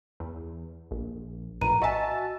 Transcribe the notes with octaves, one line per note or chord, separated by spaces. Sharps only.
E2
A#1
A#1 A2 B4 A#5 D#7
F#4 D#5 E5 G#5 A5